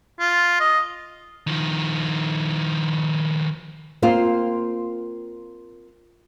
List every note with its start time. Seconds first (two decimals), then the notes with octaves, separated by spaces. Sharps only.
0.20 F4
0.60 D#5
1.47 D#3 F3
4.02 A#3 C4 F4